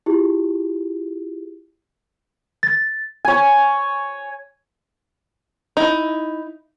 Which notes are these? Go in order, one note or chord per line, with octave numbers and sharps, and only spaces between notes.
E4 F4 G4 G#4
A6
C#5 G#5
D#4 E4